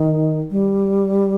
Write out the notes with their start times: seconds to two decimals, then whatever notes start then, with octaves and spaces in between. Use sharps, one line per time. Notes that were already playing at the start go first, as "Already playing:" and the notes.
Already playing: D#3
0.51 G3